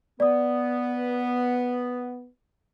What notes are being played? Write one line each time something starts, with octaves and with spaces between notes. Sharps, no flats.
B3 D5 D#6